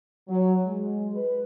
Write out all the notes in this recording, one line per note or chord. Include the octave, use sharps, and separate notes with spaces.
F#3
G#3
B4